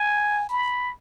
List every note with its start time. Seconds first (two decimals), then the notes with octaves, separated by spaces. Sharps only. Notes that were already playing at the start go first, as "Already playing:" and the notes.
Already playing: G#5
0.49 B5